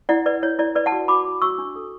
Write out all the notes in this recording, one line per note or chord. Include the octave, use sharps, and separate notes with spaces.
E4 D5 F#5
B4 D5
E4 C#5
E4 D5
B4 D5
F#5 A5
F#4
F#4 B5 D6
F#4
F#4 C#6 E6
D4
A4